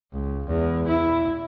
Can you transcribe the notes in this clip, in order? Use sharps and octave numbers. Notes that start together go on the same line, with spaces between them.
C#2
E2
E4